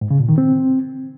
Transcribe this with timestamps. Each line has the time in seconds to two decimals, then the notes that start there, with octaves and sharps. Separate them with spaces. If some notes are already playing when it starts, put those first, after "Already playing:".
0.01 G#2
0.11 C#3
0.20 A#2
0.29 D#3
0.38 C4